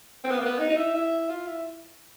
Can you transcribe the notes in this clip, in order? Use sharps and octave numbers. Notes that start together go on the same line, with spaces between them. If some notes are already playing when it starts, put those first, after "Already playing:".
C4
B3
A#3
B3
D#4
D#4
E4
E4
F4
E4